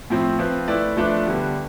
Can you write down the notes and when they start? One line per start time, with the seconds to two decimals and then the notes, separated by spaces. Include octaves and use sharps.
0.10 A2 F3 C4
0.39 F3 C4 F4 B4
0.68 A3 E4 B4 D5
0.97 F3 A3 D4 F4 B4
1.26 D3 G3 B3